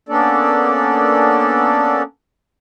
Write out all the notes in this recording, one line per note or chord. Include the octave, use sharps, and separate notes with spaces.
A#3 B3 C#4 D4 A4 D5